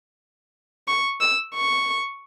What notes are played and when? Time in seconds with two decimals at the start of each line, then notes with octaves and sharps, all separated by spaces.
0.88 C#6
1.21 E6
1.54 C#6